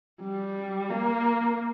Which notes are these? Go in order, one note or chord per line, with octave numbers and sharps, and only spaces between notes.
G3
A#3